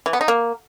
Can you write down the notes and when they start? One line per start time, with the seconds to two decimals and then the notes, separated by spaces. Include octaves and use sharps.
0.06 E3
0.13 B3
0.21 D#4
0.28 A#3